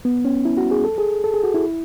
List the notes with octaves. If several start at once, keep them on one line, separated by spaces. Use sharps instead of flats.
B3
C#4
E4
F#4
G#4
A4
G#4
A4
G#4
F#4
E4